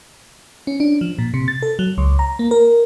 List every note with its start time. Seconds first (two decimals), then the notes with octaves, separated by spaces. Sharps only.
0.67 C#4
0.80 D4
1.01 F3
1.18 A#2
1.34 C3
1.48 A6
1.62 A4
1.79 F#3
1.98 C#2
2.19 A#5
2.39 A#3
2.51 A#4